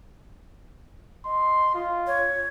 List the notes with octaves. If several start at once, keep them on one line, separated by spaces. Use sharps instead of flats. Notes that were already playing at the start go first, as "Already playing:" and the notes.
D#5 C6
F4
C#5